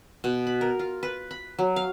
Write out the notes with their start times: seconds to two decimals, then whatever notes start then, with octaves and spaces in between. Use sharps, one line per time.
0.24 B2
0.47 B5
0.61 A#4
0.79 F4
1.03 B4
1.31 B5
1.59 F#3
1.76 F5